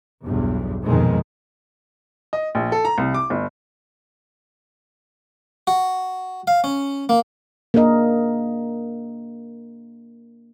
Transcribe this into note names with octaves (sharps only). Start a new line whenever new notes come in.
B1 E2 G2
A#1 F2 G#2 B2 D#3 G#3
D#5
A#1
A4
A#5
C2
D6
G1
F#4
F5
C#4
A#3
A#3 D4 G#4 A#4 D#5